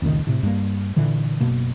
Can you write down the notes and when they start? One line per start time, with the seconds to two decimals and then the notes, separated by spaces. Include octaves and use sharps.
0.02 F1 C#2 A#2 D#3
0.27 A2 C3
0.43 G2 A#3
0.96 A#2 D3 E3
1.41 F#1 B2 A#3